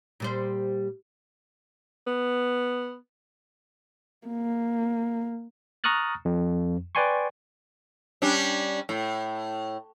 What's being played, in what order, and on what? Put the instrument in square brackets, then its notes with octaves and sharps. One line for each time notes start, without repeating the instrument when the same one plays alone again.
[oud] A#2 G3 C5
[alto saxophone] B3
[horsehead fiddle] A#3
[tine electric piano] A#5 C#6 D#6 F6 F#6 A6
F2
B4 D5 G5 G#5 C6 C#6
[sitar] G3 C#4 D4
A2